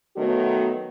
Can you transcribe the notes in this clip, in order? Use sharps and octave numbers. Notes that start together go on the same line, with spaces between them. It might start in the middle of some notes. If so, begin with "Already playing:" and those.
D#3 F#3 A3 B3 F#4